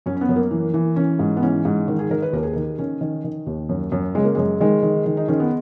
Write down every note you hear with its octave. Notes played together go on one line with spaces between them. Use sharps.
F#2 C#4
C#4
B3
F#2
A#3
E3
E3
E3 C#4
G#2
B3
E3 C#4
G#2
D#3
G#4
D#3 A#4
B4
D#2 A#4
G#4
D#3 A#4
D#3 C#4
D#3
D#3
D#2
F#2
F#2
C#3 G#3
A#3
F#2 G#3
D#3 G#3
D#3
D#3
D#4
D#3 C#4
B3